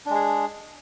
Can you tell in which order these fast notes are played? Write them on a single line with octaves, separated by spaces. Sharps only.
D4 G#3 G#4